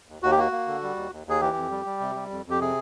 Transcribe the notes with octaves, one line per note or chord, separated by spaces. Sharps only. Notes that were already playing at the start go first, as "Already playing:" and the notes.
D#2
D#2 F#4
G4
A#3 F#4
A#3
D3
G3
D#2
D#2
D#2 G#4
E3 G4
F2
G3
G3
C3
G3
F2
F2 G4
C3 G#4